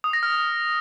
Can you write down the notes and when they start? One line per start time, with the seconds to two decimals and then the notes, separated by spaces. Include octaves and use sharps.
0.04 D#6
0.13 A#6
0.23 F6